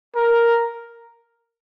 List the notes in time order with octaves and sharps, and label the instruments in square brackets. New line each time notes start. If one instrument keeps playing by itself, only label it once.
[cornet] A#4